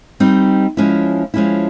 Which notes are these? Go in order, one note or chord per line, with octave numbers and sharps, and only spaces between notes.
G3 C4 D#4
F3 G#3 C#4 E4
F3 G#3 C#4 E4